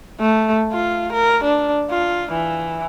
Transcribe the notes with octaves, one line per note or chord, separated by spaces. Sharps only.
A3
F4
A#4
D4
F4
E3